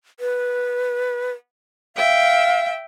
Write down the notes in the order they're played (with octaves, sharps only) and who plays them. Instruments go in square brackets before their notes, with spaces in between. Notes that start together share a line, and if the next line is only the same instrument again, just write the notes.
[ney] B4
[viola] E5 G5 [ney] F5